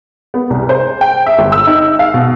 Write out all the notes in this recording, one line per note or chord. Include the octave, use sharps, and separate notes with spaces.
B3
C2
C5
G5
E5
G1
E6
D#4
F5
B2